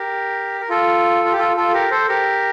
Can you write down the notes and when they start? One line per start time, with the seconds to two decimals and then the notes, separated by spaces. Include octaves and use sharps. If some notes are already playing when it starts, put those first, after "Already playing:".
Already playing: G4 A#4
0.61 A#4
0.69 F4 A4
1.25 F4
1.32 G4
1.38 F4 A4
1.56 F4 A4
1.73 G4 A#4
1.91 A4 C5
2.08 G4 A#4